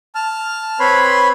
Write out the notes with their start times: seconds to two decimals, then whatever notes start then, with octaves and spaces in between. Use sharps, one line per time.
0.15 A5 F6
0.80 C4 B4 C#5 B5 C6